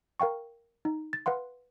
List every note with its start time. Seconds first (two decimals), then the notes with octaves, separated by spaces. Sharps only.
0.20 A#4 F5 G5 C#6
0.85 D#4
1.13 A6
1.26 B4 F5 F#5 C6